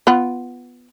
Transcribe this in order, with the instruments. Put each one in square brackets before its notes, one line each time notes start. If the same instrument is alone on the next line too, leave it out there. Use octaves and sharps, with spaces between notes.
[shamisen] B3 F4 F#5